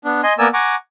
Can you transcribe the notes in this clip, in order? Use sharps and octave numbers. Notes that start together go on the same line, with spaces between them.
B3 D4
D#5 G#5 C6
A#3 B3 A#4 D5 G#5 E6
F#5 G#5 A#5 C#6 D6